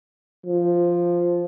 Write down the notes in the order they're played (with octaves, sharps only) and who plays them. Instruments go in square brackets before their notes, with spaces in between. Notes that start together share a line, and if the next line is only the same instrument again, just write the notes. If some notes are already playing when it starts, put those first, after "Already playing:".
[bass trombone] F3